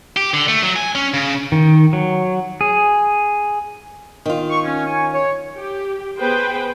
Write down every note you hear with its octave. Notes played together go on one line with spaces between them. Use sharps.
G4
D3
A3
F#3
G#5
C#4
C#3
D#3
F#3
G#4
D#3 F4
C#6
C#4
C#5 G#5 C#6
C#5
G4
B3 G#4 B4 C5 G5